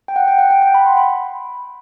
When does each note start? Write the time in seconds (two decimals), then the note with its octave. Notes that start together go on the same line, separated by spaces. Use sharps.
0.08 G5
0.16 F#5
0.28 G5
0.38 F#5
0.50 G5
0.62 G5
0.74 B5
0.87 C6
0.97 B5